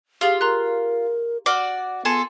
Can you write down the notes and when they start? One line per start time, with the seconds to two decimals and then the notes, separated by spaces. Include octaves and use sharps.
0.21 F4 G4 G#4 F5
0.41 A#4 A#5 C6 F#6
1.46 F#4 D5 F#5 D6 F6 G7
2.05 B3 F4 G#4 A4